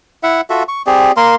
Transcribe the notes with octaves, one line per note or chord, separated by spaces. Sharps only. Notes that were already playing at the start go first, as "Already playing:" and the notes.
E4 E5 F#5
F4 F#4 A4 E5
C#6
C4 G4 G#4 D5
A#3 A#4 C6